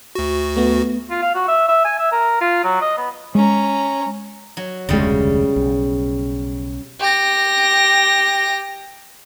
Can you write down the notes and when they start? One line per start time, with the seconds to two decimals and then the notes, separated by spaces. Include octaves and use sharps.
0.15 D2 F#4
0.56 A3 B3
1.10 F4
1.22 F5
1.35 F#4
1.48 E5
1.68 E5
1.85 G#5
1.99 E5
2.12 A#4
2.41 F4
2.64 F#3
2.81 D#5
2.97 B3
3.35 G#3 C#4 A#5
4.57 F#3
4.89 F1 D2 C#3 G3 G#3
5.56 B1
7.00 G4 A#6